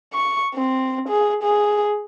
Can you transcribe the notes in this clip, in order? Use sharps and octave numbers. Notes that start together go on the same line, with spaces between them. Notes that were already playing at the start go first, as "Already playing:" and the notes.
C#6
C4
G#4
G#4